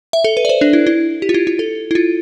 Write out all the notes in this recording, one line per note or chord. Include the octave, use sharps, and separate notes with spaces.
E5
A4
B4
D5
C5
D4
E4
E4
G4
F4
E4
F4
A4
E4
F4